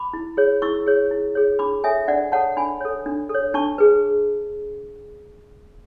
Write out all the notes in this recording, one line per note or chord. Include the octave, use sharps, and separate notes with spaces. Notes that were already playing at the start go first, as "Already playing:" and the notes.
Already playing: B5 D6
E4
G#4 C#5
E4 C#6 E6
G#4 C#5
E4
G#4 C#5
D4 B5 D6
A4 C#5 E5 G#5
D4 D5 F#5
A4 C#5 F#5 A5
D4 G#5 B5
A4 C#5
D4
A4
C#5
D4 A5 C#6
G#4 B4